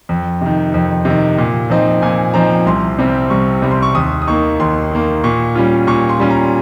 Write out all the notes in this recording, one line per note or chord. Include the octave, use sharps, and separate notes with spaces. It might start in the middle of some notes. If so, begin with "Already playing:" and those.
F2
C3 D#3
F2
C3
D#3
A#2
F3 C4 D#4
A#2 G#5
F3 C4 D#4 A#5
C2 C6
C3 G3 C4
C2 C#6
C3 G3 C4
C6
C#6
D#2 D#6
D#6
D#3 A#3 C#6
D#2 C6
D#3 A#3
A#2 C#6
G3 C#4 F4
A#2 C#6
C6
G3 C#4 F4
A#5